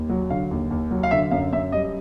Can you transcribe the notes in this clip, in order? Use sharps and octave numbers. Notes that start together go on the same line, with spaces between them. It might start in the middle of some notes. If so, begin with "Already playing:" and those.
Already playing: D#2
F#3
D3 F5
D#2
D#2
F#3
F5
D3 E5
F#2 F5
F#2 E5
G3 D#5